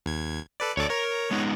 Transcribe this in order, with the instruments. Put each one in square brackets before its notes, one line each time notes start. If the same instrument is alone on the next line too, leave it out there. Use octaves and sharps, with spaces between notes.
[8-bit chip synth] D#2 G#6
A4 B4 D5
[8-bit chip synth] D2 A4 D6 [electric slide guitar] C#5 D5
[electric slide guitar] A#4 [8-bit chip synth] C#5
[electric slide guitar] G#3 B3 D#4